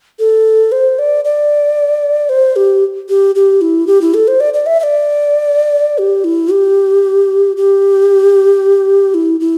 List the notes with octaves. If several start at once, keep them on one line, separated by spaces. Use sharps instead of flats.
A4
C5
D5
D5
C5
G4
G4
G4
E4
G4
E4
A4
C5
D5
D5
E5
E5
D5
G4
E4
G4
G4
E4
E4